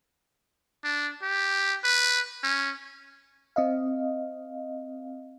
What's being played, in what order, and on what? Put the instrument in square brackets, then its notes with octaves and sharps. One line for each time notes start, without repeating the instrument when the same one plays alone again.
[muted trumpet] D4
G4
B4
C#4
[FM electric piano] C4 D#5 F5